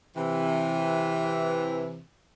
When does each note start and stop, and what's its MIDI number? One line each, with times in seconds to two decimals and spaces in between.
0.16 2.01 48
0.16 2.01 52